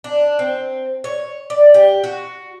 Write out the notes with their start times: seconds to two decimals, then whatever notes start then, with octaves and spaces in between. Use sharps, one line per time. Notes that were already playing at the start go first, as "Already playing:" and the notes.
0.04 D4
0.39 C4
1.04 C#5
1.50 D5
1.74 G4
2.04 F#4